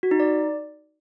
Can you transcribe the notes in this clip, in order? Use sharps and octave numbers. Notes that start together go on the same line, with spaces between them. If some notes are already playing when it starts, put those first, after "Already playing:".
F#4
D#4
D5